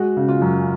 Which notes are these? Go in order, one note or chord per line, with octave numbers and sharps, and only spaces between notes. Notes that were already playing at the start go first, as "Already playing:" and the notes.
Already playing: G#3 F#4
C#3
F4
F#2